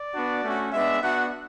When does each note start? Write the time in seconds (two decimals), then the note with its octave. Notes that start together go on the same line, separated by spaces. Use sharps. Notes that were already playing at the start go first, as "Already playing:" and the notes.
Already playing: D5
0.14 B3 D4 F#4
0.43 A3 C#4 F#4
0.72 G#3 B3 D4 E5
1.01 B3 D4 F#4 F#5